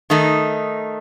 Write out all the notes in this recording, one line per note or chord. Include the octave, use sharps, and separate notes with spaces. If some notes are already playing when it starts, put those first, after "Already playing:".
D#3 A3 D#4